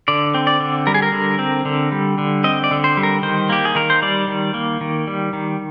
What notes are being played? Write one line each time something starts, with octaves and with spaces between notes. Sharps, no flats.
D3 D5
C4
D5
D3
G3 A#4
G#4
A#4
D3
C4
D3
G3
D3
C4 D#5
D5
D3
C5
G3
A#4
D#3 C5
A#3 G4
G#4
D#3 A#4
C5
G3 D5
D#3
A#3
D#3
G3
D#3